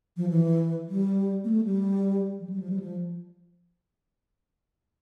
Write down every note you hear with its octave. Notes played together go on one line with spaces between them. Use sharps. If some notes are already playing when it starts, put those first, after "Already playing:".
F3
E3
G3
A#3
A3
G3
F3
G3
F3
G3
F3